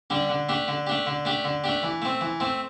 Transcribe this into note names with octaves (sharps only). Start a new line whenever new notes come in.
D3 G3 D4
D3
A3 D4 G4
D3
A3 D4 G4
D3
A3 D4 G4
D3
A3 D4 G4
E3
A3 C4
E3
A3 C4